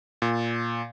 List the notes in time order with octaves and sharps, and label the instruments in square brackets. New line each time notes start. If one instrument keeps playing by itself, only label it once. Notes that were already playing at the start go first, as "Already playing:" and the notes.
[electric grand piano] A#2